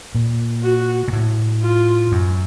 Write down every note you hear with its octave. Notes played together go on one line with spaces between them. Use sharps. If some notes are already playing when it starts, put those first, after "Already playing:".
A#2
F#4
A#2
A2
F4
F#2